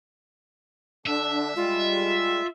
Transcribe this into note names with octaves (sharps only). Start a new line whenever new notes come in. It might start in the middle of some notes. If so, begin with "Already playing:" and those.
D3 D4 E5
G3 G#3 F4